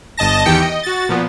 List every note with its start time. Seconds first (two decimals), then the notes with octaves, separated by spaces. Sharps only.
0.17 G1 D#5 A5 A#6
0.45 E2 D#3 E3 G4 G5 C#7
0.62 D#5
0.83 F#4 A6
1.09 A#2 F3 B3